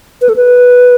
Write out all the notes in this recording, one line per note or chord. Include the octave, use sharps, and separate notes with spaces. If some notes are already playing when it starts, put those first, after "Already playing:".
B4
A4
B4